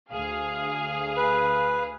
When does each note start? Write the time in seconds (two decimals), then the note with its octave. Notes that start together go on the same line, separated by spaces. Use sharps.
0.12 D2 G#4 F5
1.17 B4